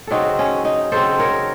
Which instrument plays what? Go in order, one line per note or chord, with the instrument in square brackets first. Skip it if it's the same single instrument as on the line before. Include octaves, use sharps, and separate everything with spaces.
[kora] C#3 F#3 C4 D#4 F#4 A4
C#4
D#4
C#3 F#3 C4 A4 C5
A#4 C#5